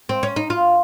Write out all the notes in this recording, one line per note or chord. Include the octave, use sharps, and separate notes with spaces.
C4
C#4
D#4
F4